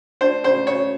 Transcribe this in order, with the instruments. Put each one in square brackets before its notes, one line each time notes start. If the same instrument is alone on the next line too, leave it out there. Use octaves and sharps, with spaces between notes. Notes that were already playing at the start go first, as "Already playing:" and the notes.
[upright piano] D4 [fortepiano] C5
[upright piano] C#3 [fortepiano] C5
[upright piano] C#3 [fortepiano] C#5